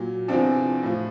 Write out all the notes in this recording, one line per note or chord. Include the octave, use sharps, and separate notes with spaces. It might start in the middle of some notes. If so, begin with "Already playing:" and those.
Already playing: A#2 F#3
E2 C3 F3 C4 D4
A2 F3